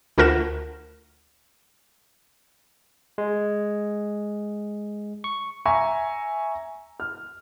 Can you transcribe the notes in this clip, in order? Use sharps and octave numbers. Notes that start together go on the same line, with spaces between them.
D2 A3 F4 A#4 F#5 E7
G#3
C#6
E5 G#5 A#5 C#6
F6